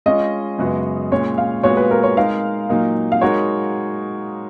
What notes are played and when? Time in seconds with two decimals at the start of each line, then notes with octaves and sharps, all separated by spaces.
0.06 G#3 C#4 F4 D#5
0.58 F#2 C#3 G#3 B3 F#4
1.12 A#2 G#3 C#4 C#5
1.38 F5
1.63 A#2 G#3 B3 F#4 C#5
1.77 B4
1.91 A#4
2.03 C#5
2.17 G#3 D#4 A#4 F5
2.69 A#2 F#3 A#3 D#4
3.12 F5
3.21 G#3 D#4 F#4 A#4 C#5 F#5